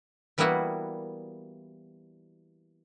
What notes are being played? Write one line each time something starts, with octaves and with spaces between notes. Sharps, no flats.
E3 G3 A#3 B3 E4 F#4